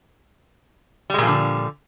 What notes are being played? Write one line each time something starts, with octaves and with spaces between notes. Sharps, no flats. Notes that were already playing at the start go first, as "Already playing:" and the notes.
A#2 D3 F3 G3 G#3